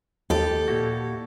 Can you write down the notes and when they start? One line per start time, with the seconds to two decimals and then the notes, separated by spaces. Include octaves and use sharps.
0.30 D#2 G4 A4
0.68 A#2 E4 F#4